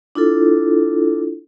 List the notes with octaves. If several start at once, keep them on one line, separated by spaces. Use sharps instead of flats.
D4 E4 F4 A4